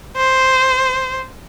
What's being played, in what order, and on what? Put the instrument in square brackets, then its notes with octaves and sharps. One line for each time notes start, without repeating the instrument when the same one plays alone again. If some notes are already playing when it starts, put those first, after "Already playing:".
[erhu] C5